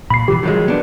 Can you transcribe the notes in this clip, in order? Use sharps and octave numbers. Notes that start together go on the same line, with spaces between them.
A#2 B5 C7
B2 E3 F3 G4
D#3 F3 F#3 G#3
B3 D4